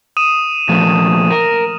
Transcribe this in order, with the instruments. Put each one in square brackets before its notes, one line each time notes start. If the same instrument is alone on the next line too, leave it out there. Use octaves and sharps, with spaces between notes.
[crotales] D#6 D#7 E7
[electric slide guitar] A#2 F3 A3
A#4